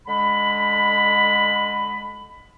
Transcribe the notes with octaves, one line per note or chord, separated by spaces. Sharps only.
D3 G#3 B5